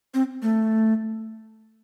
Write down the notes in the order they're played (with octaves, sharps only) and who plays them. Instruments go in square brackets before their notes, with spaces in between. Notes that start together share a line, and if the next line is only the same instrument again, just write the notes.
[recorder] C4
A3